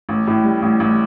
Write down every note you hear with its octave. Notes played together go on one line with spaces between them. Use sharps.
A1
A2
G3
A1
A1